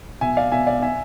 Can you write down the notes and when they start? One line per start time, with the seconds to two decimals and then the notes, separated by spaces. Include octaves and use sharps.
0.21 B1 E5 G#5
0.37 D5 F5
0.52 B2 E5 G#5
0.67 D5 F5
0.82 E5 G#5